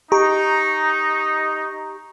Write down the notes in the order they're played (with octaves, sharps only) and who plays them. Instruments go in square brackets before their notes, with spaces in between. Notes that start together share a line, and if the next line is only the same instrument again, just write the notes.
[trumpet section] D#4 [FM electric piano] G4 A#5 C#6